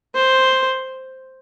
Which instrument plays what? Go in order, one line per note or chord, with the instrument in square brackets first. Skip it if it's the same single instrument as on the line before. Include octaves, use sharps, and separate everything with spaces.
[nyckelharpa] C5